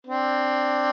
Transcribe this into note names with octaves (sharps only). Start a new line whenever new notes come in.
C4 D4